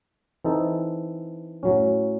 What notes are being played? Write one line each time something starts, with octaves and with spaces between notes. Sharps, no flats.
E3 C4 D#4 A4
A2 F#3 C#4